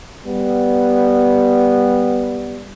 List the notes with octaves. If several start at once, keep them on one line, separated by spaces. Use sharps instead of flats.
G3 B3